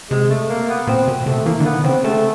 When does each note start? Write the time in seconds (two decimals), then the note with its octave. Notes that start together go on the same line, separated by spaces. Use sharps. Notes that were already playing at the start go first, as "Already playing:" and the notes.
0.11 C3 G#3
0.30 A3
0.49 A#3
0.69 B3
0.87 A#2 C4
1.08 B2
1.26 C3 A3
1.46 E3 A#3
1.60 D3
1.65 D#3 B3
1.84 C#3 C4
2.04 C#3 A3